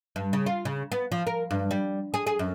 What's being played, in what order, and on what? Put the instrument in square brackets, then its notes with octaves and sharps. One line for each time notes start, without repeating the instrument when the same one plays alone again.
[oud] G2
C#3
F4
C#3
B3
F3
A#4
G2
G3
G#4
G#4
F#2